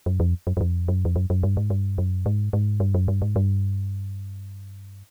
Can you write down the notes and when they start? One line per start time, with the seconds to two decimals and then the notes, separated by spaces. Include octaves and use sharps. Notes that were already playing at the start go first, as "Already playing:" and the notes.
0.06 F#2
0.20 F2
0.47 F#2
0.57 F#2
0.61 F2
0.88 F#2
1.05 F2
1.16 F#2
1.30 F#2
1.43 G2
1.57 G#2
1.70 G2
1.98 F#2
2.26 G#2
2.53 G#2
2.80 G2
2.94 F#2
3.08 G2
3.22 G#2
3.36 G2